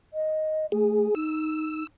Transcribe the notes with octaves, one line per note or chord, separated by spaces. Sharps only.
D#5
A3 G#4
D#4 E6